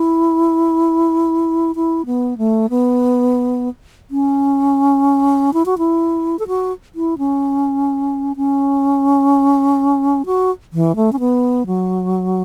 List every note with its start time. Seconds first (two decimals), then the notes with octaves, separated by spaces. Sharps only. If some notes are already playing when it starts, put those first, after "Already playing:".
Already playing: E4
1.75 E4
2.06 B3
2.38 A3
2.70 B3
4.11 C#4
5.53 E4
5.66 F#4
5.78 E4
6.39 A4
6.48 F#4
6.95 E4
7.18 C#4
8.36 C#4
10.26 F#4
10.73 E3
10.96 A3
11.12 C#4
11.19 B3
11.66 F#3